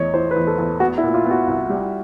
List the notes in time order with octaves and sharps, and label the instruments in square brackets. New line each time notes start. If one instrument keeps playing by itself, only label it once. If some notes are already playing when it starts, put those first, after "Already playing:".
Already playing: [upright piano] E2 [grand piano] C#5 D#5
[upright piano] E3 [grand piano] C5
[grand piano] B4
[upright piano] E2
[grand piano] A4
[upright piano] E2
[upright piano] B3 [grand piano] F#4
[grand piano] E4
[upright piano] A#2
[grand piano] F4
[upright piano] B3
[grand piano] F#4
[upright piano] C2
G3